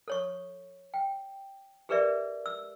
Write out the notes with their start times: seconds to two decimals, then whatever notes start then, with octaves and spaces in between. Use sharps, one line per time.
0.08 A4 C#5 C#6
0.94 G5
1.89 G4 G#4 A#4 B4 D5 E5
2.46 E6